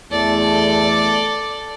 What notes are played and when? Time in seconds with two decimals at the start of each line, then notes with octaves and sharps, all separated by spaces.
0.11 E2 A3 A4 D5